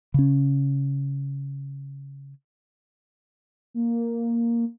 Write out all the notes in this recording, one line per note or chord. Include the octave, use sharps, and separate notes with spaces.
C#3 C#4
A#3